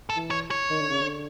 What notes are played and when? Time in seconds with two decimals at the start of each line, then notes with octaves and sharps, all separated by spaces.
0.10 A4
0.16 E3
0.31 C#5
0.51 C#5
0.70 D#3
0.80 D3
0.90 C#3
1.01 D3